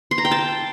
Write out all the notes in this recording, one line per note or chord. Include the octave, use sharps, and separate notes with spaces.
C6
A#5
G5
A5